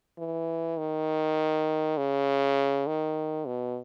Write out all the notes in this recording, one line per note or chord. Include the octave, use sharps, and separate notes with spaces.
E3
D#3
C#3
D#3
B2